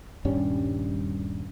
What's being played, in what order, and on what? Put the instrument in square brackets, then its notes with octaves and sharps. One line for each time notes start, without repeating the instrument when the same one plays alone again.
[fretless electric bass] D#1 G2 G3 C#4